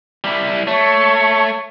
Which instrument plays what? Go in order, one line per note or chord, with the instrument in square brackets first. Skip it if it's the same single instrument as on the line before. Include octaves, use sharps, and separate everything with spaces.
[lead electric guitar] G3 E4
[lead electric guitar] A3 [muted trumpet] C#5